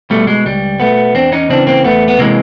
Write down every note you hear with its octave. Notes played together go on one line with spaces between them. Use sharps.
B2 G3 A3
G#3
C#2 G3
B2 A3 B3
E2 C4 D4
C#4 D#4
C#3 E3 C4 D4
A#3 C4
E2 A3 B3
B3
C3 E3 G#3 A#3